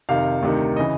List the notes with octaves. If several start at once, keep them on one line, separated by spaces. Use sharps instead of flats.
F2 C3 D#3 F5
D2 C3 D#3
C#3 E3 D#5